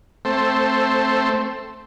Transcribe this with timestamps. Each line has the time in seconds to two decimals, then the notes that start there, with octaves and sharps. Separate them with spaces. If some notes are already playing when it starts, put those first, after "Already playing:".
0.25 A3 C4